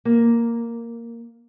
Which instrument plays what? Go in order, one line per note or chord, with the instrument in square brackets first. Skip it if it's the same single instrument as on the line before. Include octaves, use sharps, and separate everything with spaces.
[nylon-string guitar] A#3